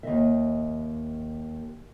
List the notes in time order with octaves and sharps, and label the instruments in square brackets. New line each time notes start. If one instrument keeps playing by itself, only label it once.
[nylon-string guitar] D#2 D#5 E5